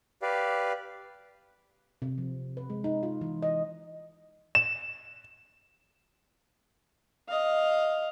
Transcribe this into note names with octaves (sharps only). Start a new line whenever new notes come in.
G4 B4 D5 F5
C3
F3
B4
G#3
D#4
F4
E3
D#5
E7
D#5 F5